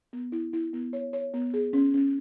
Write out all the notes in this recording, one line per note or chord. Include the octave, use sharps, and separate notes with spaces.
B3
E4
E4
B3
C#5
C#5
B3
G#4
C#4
C#4